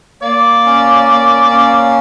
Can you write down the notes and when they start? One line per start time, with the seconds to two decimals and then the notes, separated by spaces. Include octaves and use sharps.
0.22 A#3 D5
0.66 C#4
1.08 A#3
1.50 C#4